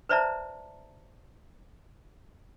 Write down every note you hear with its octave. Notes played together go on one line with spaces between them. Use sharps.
B4 C5 D5 E5 A5 A#5